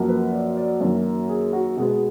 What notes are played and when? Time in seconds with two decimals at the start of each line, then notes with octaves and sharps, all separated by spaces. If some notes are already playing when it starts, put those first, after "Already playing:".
Already playing: F#2 F3 A#3
0.09 B4
0.32 D5
0.57 D5
0.81 F#2 D#3 F#3 A#3
1.29 G#4
1.53 F#4
1.77 B2 G#3 B3 G#4